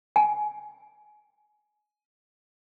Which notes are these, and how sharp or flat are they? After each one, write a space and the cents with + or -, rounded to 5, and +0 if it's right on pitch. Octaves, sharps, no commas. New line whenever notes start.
G#5 +20